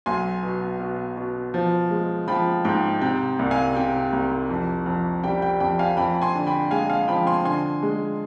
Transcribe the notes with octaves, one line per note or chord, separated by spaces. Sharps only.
B1 G#5 C6
B2
B2
B2
F3
G#3
F3 G5 B5
G#2 G5
C3 G5
C2
F5 G#5
C3 G5
C2
F2
F2
G3 G5
G5
F2 G5
F5 G#5
F2 G5 B5
G#5 C6
D3
G5 B5
G#3 F5 G#5
F5 G#5
F3 G5 B5
G#5 C6
D3 G#5 C6
G#3